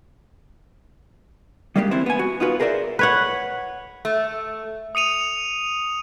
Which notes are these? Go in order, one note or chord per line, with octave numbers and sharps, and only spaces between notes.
G3 G#3 A#3 D4 F#4 G4
E3 C4 D4 E4 C5
B3 G#5
F#4
B3 D#4 F4 F#4 B4
G#4 A#4 C5 D5 E5
B4 C#5 F#5
A3
D#6 C#7 D#7 F7